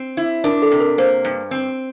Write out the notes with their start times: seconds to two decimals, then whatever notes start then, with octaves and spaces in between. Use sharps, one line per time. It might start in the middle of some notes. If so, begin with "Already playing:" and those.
Already playing: C4
0.17 E4
0.44 D4 A#4
0.62 A4
0.71 C3
0.80 A#4
0.98 A#3 C5
1.24 G2
1.51 C4